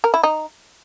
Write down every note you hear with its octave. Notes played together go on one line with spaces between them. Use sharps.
A#4
E4
D#4